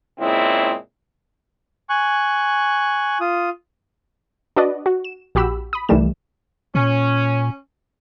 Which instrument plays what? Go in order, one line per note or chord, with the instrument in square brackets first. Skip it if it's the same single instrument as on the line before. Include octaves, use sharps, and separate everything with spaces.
[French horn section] A#2 C#3 G#3 C4 E4
[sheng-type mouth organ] G#5 C#6 F#6
F4 D#6
[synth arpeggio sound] D4 F#4 B4 D5 D#5
F#4
E7
A#1 F#4 G4 B5 E6
B5 D#6
C2 D#3 E3 G3 A3 E7
[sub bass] A#2 [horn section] C#4